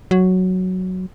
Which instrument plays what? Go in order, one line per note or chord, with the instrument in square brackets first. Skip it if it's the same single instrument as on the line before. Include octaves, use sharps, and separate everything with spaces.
[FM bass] F#3